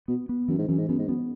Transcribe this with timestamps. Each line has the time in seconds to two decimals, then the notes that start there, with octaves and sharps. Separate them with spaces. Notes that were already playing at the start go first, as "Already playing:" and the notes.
0.08 B2 B3
0.29 B3
0.48 F#2 E3
0.59 G#2
0.68 F#2 E3
0.79 G#2
0.89 F#2 B3
0.99 G#2
1.08 F#2 B3